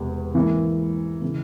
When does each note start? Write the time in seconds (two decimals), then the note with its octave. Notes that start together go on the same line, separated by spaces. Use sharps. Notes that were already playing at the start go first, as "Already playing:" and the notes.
Already playing: E1 E2 C3
0.35 G#2 E3 A#3
1.22 C#3 E3